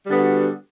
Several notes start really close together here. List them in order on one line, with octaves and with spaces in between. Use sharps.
G3 D3 B3 F#4